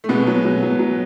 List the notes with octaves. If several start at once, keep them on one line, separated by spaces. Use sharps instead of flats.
A3
B2 G#3 B3
F#3
B2
F#3
F#3